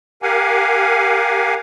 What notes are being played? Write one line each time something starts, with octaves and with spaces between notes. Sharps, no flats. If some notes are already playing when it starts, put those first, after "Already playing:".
G4 A#4 F5 F#5 G#5